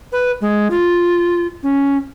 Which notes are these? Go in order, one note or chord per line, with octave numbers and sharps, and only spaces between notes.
B4
G#3
F4
C#4